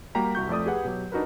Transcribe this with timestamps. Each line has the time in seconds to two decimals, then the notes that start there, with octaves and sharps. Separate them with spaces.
0.15 G3 A#3 F#4 G5 A#5 B6
0.35 C2 F#4 C#6 G6
0.49 F2 A3 D5 D#6
0.66 G4 G#4 B4 F#5
0.85 B2 F#3 G4
1.12 D4 D#4 F#4 A#4 B4